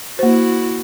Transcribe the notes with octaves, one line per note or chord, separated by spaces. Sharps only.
A#3 E4 F#4 C5